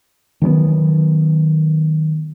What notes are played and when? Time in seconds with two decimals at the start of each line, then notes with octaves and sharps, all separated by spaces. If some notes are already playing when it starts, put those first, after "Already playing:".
0.42 D#3 F#3 G3 B3